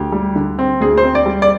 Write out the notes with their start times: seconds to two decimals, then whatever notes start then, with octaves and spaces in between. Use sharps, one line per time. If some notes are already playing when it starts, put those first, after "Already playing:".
Already playing: D2 G4
0.12 G3
0.36 D3
0.59 C4
0.80 D2 G#4
0.97 C5
1.04 C4
1.15 D5
1.26 G3
1.42 D5